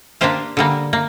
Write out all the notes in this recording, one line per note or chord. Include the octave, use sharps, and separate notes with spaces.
A#3 D4 G4 C5 F5
D3 G3 A#3
A#3